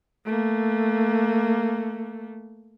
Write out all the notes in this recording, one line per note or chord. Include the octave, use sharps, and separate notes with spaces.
A3 A#3